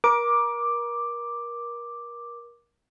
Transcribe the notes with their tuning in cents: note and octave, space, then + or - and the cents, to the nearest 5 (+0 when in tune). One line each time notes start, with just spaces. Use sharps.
A#4 +30 D6 +5